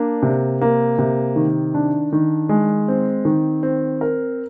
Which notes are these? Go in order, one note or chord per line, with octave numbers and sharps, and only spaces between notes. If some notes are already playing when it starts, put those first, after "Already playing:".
Already playing: A#3 D4
C3
A#3
C3
D#3
D4
D#3
G#3
C4
D#3
C4
A#4